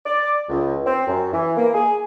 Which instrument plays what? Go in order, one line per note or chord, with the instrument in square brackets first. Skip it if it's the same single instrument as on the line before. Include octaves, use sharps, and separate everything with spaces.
[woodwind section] D5
C#2
C4
F#2
E3
A#3
G#4